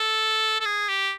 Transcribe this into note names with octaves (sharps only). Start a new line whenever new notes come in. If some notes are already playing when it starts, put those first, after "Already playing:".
Already playing: A4
A4
G#4
G4